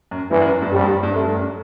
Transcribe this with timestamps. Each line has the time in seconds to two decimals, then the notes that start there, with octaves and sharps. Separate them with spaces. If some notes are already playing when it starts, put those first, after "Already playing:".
0.11 F#2
0.31 G2 E3
0.42 F#2
0.52 F#2
0.62 G2
0.72 F#2 G3
0.83 G2
1.03 G2
1.14 F#2 A3
1.24 G2
1.35 F#2